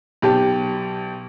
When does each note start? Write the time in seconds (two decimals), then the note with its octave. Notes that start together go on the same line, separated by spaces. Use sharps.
0.22 B1 G4 A5